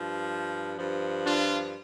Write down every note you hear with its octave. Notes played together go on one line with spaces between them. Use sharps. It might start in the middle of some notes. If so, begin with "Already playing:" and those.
Already playing: G2 F3
G2 F3
D4 F4